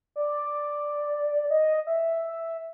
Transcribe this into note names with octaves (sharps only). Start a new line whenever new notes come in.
D5
D#5
E5